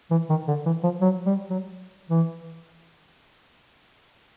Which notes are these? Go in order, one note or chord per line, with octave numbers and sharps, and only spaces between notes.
E3
D#3
D3
E3
F3
F#3
G3
F#3
E3